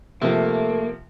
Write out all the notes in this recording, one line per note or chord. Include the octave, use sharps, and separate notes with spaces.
C3 F3 A3 A#3